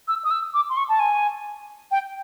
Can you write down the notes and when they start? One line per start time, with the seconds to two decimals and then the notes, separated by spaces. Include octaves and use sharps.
0.08 E6
0.25 D#6
0.31 E6
0.54 D6
0.70 C6
0.77 C#6
0.89 A5
0.99 G#5
1.91 G5